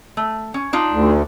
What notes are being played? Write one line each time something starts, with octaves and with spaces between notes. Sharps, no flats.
A3
C#4
D4 D#4 F4
D2